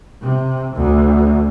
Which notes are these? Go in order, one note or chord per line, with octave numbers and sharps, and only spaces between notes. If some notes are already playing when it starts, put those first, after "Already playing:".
C3
D2